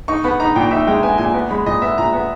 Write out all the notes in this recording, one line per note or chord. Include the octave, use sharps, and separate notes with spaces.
D#4 C#6
B3 B5
D#4 A#5
A#2 G5
D#4 E5
G#3 G5
B3 G#5
A#2 G#5
B3
G#3 B5
A#2 D#5
B3 E5
A#2 A#5
B3